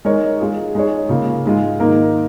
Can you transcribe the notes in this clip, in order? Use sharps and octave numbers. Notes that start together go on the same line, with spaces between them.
G#3 D#4 A#4 C#5
G#3 F4 G#4
G#3 D#4 G#4 C#5
C#3 A#3 F4
G#2 G#3 F4
G#2 D#3 A#3 D#4 A#4